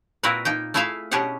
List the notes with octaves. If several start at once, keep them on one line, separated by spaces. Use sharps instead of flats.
A#2 C4 E4 F#4 A#4 B4
A#3 D#4 G5
A3 E4 F4 G#4 E5 F5
B2 C#4 D4 G4 G#4 F#5